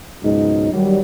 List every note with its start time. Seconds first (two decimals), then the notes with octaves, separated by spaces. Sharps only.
0.22 C#2 G#2 B2 F#3 D#4
0.71 D#3 F#3 G3